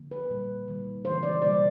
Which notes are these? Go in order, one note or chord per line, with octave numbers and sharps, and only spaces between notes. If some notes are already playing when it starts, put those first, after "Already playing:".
Already playing: D3 F3 A#3
B4
A#2 G3 A#3
D#3 G3 A#3
C#3 E3 G#3 C5
D5
B2 G3 A#3 D5